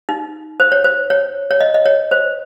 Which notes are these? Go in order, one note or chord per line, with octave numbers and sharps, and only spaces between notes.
D#4
C5
C#5
C5
C#5
C#5
D#5
D#5
C#5
C5